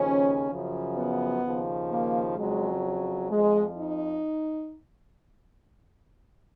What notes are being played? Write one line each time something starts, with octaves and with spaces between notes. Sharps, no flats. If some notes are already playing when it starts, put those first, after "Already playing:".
Already playing: D#2 C#3 F3 C#4
F#2 C#3 F3
B3
D#2 C#3 F3
A#3
F2 C#3 F#3 G#3
F2 F3 G#3
D#4